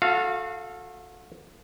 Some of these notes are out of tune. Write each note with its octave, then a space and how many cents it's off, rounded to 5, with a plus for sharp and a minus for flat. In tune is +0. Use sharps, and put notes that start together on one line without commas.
F#4 -35 A4 +0 F5 -10